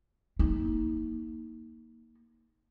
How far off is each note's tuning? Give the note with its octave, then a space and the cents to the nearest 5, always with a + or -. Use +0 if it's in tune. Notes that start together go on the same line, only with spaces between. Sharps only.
A#3 +0 D#4 +25